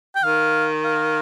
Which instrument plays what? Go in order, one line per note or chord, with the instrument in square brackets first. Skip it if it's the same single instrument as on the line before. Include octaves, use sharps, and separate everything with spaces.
[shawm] G5
[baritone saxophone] D#3 [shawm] F5
[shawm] F5